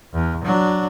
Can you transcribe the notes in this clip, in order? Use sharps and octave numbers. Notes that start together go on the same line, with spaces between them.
E2
F#3 D4